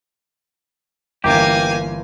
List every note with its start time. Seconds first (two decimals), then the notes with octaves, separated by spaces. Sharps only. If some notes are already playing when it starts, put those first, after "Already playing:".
1.24 G1 E3 A#3 G4 G#5